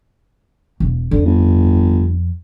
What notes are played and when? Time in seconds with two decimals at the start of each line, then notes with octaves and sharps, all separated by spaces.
0.80 E1
1.11 F2 D3
1.25 G1